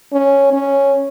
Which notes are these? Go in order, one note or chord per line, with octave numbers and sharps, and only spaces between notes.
C#4
C#4